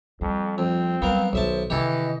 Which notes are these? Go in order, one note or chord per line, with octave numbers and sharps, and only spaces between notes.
F2 G3
F2 C4
F#3 G3 B3 A#4 F5
B1 B2 D#3 C5 E5 A5
C3 D#3 E3 G4 A4 D#5